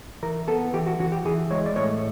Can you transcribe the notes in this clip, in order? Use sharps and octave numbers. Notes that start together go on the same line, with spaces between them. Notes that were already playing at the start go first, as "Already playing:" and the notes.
E3 A#4
B3 A4
E3 G4
F#4
E3 F#4
G4
E3 G#4
G#3 C#5
D5
A2 C#5